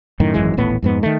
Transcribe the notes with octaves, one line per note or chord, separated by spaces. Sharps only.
F#2 A2 D#3
G#1 F#2 E3 G#3
D#1 A1 A2 B3
F2 G#2 B3
D#3 A3